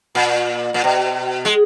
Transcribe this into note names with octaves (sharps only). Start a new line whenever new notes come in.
A#2
A#2
B2
G#3